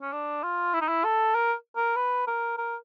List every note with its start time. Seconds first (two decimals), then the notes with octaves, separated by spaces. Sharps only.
0.02 C#4
0.13 D4
0.43 F4
0.74 E4
0.81 D#4
0.88 E4
1.05 A4
1.35 A#4
1.76 A#4
1.96 B4
2.27 A#4
2.58 A#4